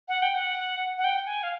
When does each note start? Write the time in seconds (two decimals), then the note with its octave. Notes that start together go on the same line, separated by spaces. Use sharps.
0.08 F#5
0.22 G5
0.35 F#5
0.98 F#5
1.04 G5
1.26 G#5
1.43 F5